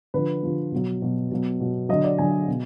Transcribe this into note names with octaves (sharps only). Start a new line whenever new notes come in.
D3 F3 B4
D3 F3
B2 F#3
B2 F#3
B2 F#3
B2 F#3
D3 F#3 D#5
D5
D3 F#3 G#5
B2